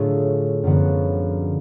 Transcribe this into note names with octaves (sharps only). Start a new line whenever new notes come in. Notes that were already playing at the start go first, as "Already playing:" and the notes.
Already playing: A2 D3 F#3 A3 D4 F4 G#4
F#2 D3 F3 B3 F#4